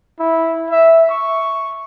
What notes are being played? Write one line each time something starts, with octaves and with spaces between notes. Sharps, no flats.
E4
E5
C#6